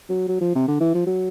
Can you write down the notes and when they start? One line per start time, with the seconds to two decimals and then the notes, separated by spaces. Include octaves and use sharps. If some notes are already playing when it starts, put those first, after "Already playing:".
0.09 F#3
0.28 F#3
0.41 F3
0.55 C3
0.68 D3
0.81 E3
0.95 F3
1.07 F#3